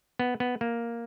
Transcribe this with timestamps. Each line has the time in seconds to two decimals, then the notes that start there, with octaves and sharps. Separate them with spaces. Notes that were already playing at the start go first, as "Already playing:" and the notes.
0.19 B3
0.40 B3
0.61 A#3